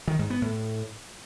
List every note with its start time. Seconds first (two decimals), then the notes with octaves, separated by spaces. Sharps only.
0.08 D#3
0.19 G#2
0.30 B3
0.42 A2